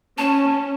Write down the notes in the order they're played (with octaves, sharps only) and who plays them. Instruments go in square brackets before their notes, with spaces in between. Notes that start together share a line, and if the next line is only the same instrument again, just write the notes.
[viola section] C#4 [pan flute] A5